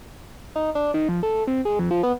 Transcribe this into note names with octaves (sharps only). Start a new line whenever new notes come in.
D#4
D4
D#3
F2
A3
C3
G#3
F2
F3
B3